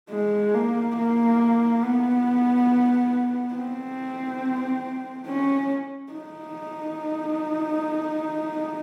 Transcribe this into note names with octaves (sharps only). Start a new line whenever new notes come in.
G#3
A#3
A#3
B3
C4
C#4
D#4